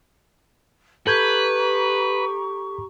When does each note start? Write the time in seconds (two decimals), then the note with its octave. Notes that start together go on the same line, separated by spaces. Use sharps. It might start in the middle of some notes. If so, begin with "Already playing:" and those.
1.07 G4 A4 B4 A#5 C#6 G6 G#6